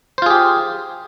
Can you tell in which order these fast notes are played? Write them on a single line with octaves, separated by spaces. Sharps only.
C5 F4 G#4 G4